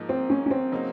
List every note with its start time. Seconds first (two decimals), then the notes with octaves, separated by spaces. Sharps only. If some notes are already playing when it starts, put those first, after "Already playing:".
Already playing: G#2 F3 A#3 D#4
0.09 C4
0.30 C#4
0.46 C#4
0.51 C4
0.72 C#3 F#3 A#3 D#4